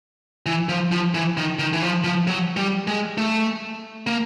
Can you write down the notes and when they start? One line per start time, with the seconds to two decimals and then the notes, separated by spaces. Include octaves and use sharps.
0.46 E3
0.69 F3
0.92 F3
1.14 E3
1.37 D#3
1.59 D#3
1.73 E3
1.82 F3
2.04 F3
2.27 F#3
2.57 G3
2.88 G#3
3.18 A3
4.07 A#3